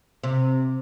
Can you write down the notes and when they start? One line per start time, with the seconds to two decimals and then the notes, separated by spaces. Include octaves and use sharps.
0.23 C3